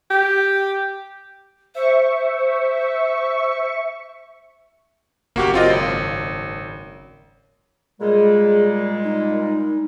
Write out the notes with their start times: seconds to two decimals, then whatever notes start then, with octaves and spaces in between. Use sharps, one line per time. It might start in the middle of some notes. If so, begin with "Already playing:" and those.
0.10 G4
1.75 C5 E5 C#6
5.36 F#1 A#3 F#4 G4
5.54 C4 F4 D#5
5.70 G#1
8.00 A#2 G3 G#3 G#4
9.04 D#4